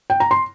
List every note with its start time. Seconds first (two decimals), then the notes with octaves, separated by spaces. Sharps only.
0.10 G5
0.20 A#5
0.31 C6